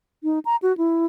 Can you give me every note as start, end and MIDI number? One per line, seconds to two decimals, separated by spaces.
0.24 0.39 63
0.45 0.56 82
0.62 0.76 66
0.78 1.06 64